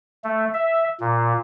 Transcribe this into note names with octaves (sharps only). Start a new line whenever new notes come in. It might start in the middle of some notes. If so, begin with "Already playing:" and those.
A3
E5
A#2